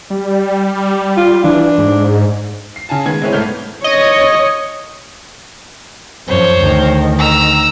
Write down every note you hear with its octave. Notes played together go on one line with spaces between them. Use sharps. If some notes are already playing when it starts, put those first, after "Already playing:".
G3
F4
E3 D4
G#2
C7
C#3 G#5 A5
D#3 G#3 B3 G#6
G#3 C4 E4 B4 C#5
C2 G#2 A3 B3 F6 G6
C#5 D#5
F#2 F3 C5 C#5
D2 D#3
A#5 E6